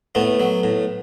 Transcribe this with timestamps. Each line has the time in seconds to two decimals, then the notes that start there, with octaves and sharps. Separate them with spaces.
0.15 A2 A3 B3
0.40 F#3
0.63 A2